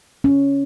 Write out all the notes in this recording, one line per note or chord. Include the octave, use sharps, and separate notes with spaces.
C#4